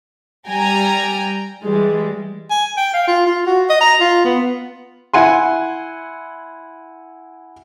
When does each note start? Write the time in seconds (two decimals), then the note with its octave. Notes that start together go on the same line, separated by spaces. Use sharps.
0.47 G3 G5 G#5 A#5
1.63 E3 G3 G#3
2.51 G#5
2.77 G5
2.94 F5
3.08 F4
3.27 F4
3.47 F#4
3.69 D#5
3.81 A#5
4.01 F4
4.25 B3
5.14 E4 F#5 G#5 C6